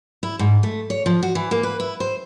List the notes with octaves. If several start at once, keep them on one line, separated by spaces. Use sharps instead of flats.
E4
G#2
A3
C#5
F3
F#4
E3
A#3
B4
E4
C5